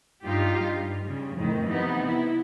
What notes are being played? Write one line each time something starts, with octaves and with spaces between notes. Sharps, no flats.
G2 D#4 F4 G4
G2
C#3 G3
F2 A2 D#3
C3 E3 B3 D#4
E4